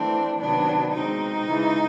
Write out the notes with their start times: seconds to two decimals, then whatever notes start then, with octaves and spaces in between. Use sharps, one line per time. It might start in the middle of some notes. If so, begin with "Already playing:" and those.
Already playing: E3 A3 C4 D4
0.40 C3 D#3 F#3 B3 D4
0.92 B2 G#3 C4 D#4
1.46 C#3 E3 G#3